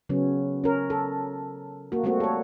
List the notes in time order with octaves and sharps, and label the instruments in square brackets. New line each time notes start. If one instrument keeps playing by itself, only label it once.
[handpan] C#3 F#3 B3 C#4
C#4 A#4
A4
A#3 F#4
G3 A3 A#3 C4 F#4
A4 C#5